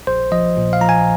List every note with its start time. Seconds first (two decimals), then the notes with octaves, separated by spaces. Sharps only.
0.07 A#1 C5
0.32 F3 D#5
0.57 A#2
0.73 F5
0.81 F3 A#5
0.89 G#5